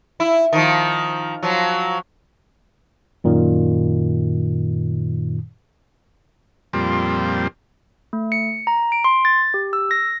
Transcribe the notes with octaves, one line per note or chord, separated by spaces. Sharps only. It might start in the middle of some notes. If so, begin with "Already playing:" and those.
E4
D#3 F3
F3 F#3
F#2 A#2 D#3
F2 A#2 G3 C4
A3
C#7
A#5
D7
C6
A6
G4
E6
A#6